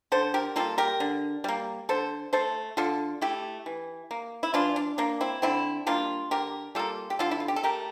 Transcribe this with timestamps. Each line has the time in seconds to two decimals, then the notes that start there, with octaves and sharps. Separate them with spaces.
0.12 D3 A4 C5
0.34 G4 A#4
0.56 G3 A#3 F4 A4
0.78 G4 A#4
1.00 D3
1.44 G3 A#3
1.89 D3 A4 C5
2.33 A3 A4 C5
2.77 D3 F4 A4
3.21 A3 E4 G4
3.66 E3
4.11 A#3
4.43 E4
4.54 E3 D4 F4
4.76 D4
4.98 A#3 D4
5.21 C4 E4
5.42 D3 C4 E4
5.86 G3 A#3 D4 F4
6.31 D3 G4 A#4
6.75 G3 A#3 F4 A4
7.10 G4
7.19 D3 F4 A4
7.31 E4
7.40 F4
7.48 G4
7.56 A4
7.63 A3 G4 A#4